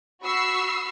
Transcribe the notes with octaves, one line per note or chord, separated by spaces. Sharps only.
F#4 B5 C#6 E6 C7